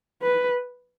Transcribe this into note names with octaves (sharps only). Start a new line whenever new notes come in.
B4